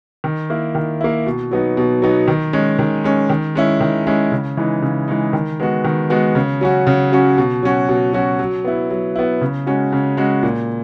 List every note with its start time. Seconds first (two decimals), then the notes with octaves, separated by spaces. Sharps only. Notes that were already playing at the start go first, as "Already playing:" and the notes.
0.24 D#3
0.50 A#3 E4
0.75 D#3
1.01 A#3 E4
1.26 B2
1.51 F#3 B3 D#4
1.77 B2
2.02 F#3 B3 D#4
2.28 D#3
2.53 G#3 C#4
2.79 D#3
3.04 G#3 C#4
3.30 D#3
3.55 G#3 C#4 E4
3.81 D#3
4.07 G#3 C#4 E4
4.32 C#3
4.57 E3 G#3 D#4
4.82 C#3
5.08 E3 G#3 D#4
5.33 D#3
5.60 G#3 B3 F#4
5.85 D#3
6.10 G#3 B3 F#4
6.35 C#3
6.61 F#3 C#4 F#4
6.87 C#3
7.12 F#3 C#4 F#4
7.38 B2
7.63 F#3 C#4 F#4
7.89 B2
8.13 F#3 C#4 F#4
8.39 F#3
8.64 B3 E4
8.90 F#3
9.16 B3 E4
9.41 C#3
9.67 G#3 C#4 F#4
9.93 C#3
10.17 G#3 C#4 F#4
10.43 A#2